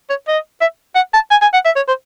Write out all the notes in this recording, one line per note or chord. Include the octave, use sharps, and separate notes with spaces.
C#5
D#5
E5
F#5
A5
G#5
G#5
F#5
E5
C#5
C5